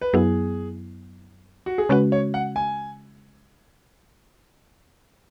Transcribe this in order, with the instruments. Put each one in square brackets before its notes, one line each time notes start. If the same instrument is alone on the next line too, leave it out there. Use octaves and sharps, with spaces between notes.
[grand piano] B4
[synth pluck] F#2 F#3 B3 E4 [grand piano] G#4
[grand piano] F#4
G#4
[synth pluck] C#3 G#3 C#4 F#4 [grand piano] B4
[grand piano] C#5
F#5
G#5